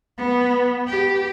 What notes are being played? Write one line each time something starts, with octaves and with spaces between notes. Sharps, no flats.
B3
G4